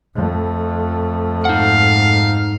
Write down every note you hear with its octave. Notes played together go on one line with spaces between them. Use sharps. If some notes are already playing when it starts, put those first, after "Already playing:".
F2 A3
G#2 D#4 F5 F#5